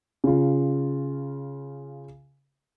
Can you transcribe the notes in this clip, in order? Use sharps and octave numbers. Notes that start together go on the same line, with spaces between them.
C#3 F4